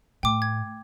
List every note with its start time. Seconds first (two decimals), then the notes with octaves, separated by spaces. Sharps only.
0.23 A2 G5 D6
0.42 G#6